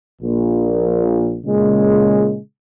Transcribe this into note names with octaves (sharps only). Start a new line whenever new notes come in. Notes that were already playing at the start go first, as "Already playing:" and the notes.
A#1 A#2
A#2 C#3 G#3